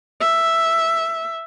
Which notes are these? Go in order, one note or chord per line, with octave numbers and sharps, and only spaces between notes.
E5